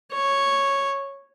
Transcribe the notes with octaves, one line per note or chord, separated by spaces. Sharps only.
C#5